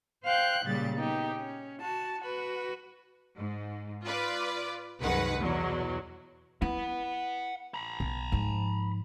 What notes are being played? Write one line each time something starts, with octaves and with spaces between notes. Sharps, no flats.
C5 F5 G5 F#6 G6
A#2 C#3 G3 A6
B3 D#4 G4
C#4
F#4 A5
F#4 B4
G#2
F4 B4 D5
C2 F#2 D#3 G#3 B4 F#5
E2 B2 F#3
E4 F#5 B5
A#5 B5
B1
G#2 F3